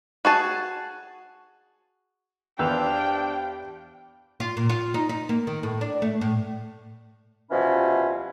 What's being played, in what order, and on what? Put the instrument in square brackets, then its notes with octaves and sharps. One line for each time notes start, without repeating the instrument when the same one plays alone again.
[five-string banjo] F#4 G#4 A5
[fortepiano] E2 B4 E6 [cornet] D4 [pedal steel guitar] G4 C5 F5 [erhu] G5
[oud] F4
A#2
F4
D#4
D#4
A#3
D#3
A2
D4
A3
A2
[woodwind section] C2 B2 E3 F3 C#4 B5